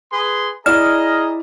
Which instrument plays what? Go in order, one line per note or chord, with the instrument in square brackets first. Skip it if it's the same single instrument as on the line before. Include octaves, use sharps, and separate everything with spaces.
[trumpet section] G#4 B4 C6
[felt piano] E4 D5 E7 [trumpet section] G#4 D#5 A#5 [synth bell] F6